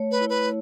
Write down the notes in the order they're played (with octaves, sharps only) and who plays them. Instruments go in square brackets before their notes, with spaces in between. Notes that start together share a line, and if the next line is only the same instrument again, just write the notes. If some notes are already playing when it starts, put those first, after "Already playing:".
Already playing: [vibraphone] A3 C#5
[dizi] B4
[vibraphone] E4
[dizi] B4